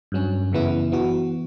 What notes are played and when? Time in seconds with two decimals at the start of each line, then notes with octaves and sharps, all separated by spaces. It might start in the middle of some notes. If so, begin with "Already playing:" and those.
0.12 G2 F#3 C#4
0.52 F#2 C#3 E3 B3 E4
0.92 E3 B3 F#4